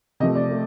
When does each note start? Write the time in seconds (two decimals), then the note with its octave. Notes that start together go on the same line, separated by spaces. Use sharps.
0.20 C3 F3 A3 D#5
0.35 D5
0.51 A3